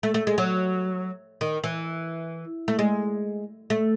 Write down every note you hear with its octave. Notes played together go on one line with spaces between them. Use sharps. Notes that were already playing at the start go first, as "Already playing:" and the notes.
A3
A3
G#3
F#3
D#3
E3
A3
G#3
A3